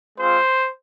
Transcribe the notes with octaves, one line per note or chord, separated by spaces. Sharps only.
G#3 C4 F4 C5